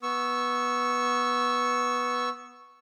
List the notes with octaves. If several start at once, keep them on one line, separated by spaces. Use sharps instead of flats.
B3 C#6 E6